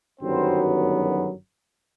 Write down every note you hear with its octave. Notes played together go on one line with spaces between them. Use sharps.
G1 F#2 D#3 F#3 B3 C4 C5